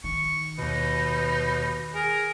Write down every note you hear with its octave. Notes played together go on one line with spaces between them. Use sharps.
D#3 C#6
D#2 B2 D#4 B4
G#4 A#4